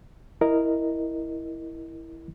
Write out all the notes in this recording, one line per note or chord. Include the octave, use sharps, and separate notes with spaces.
E4 A#4 D#5